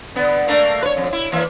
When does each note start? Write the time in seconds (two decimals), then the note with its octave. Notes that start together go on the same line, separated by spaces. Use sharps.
0.15 D3 B3
0.48 A3 A#3 D4
0.83 B4 C#5
0.97 F2
1.13 E4
1.32 E3 A#3 E5